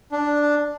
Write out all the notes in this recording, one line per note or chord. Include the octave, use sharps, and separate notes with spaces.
D4